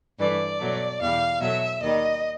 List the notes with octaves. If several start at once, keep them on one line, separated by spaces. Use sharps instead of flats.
G2 E3 A3 D5
B2 F#3 A3
E2 B2 G3 F5
B2 F#3 A3 E5
D#2 D#3 G3 D#5